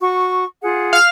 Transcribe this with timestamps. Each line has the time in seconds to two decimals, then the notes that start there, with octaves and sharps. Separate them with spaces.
0.01 F#4 C#6
0.62 F4 G#4 F#5
0.93 F5 F6